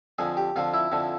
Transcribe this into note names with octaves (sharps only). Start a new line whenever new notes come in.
F2 D3 F3 G#4
G4
F2 D3 F3 F4
E4
F2 D3 F3